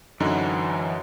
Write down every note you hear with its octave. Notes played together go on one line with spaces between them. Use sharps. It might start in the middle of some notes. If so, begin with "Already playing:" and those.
F#2 D3 E3 D#4 F#4